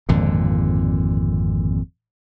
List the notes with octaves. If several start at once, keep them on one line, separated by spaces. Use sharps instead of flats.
G#1 F2 A#2 D3